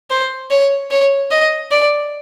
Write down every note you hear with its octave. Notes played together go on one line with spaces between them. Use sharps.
C5
C#5
C#5
D#5
D5